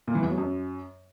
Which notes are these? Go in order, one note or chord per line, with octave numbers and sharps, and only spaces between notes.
A#2
E3
E2
F#3
F#2